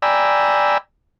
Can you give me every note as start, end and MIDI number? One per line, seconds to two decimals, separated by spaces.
0.02 0.78 74
0.02 0.78 79
0.02 0.78 80
0.02 0.78 82
0.02 0.78 83
0.02 0.78 88